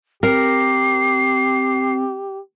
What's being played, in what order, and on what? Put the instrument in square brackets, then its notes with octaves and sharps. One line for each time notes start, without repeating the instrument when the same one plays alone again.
[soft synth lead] C4 [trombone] G4 [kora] A#4 [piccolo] C7